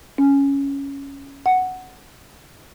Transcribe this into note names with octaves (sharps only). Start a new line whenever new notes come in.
C#4
F#5